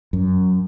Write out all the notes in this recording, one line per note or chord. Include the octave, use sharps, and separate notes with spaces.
F#2